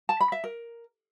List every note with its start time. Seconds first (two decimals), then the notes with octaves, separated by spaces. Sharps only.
0.09 A5
0.21 B5
0.32 E5
0.44 A#4